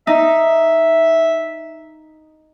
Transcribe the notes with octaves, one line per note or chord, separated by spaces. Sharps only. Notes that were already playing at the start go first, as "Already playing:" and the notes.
D#4 E5